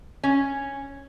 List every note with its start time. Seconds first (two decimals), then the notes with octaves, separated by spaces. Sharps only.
0.23 C#4